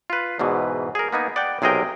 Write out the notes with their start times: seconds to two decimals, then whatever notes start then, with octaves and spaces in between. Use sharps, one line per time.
0.10 F4 B4
0.39 E2 G#2 B2 E3
0.95 G#4 A#4
1.12 A#3 B3 D#4 G#5
1.36 D5 F#5 G5
1.62 B1 C3 G#4 A#4 D#5 G5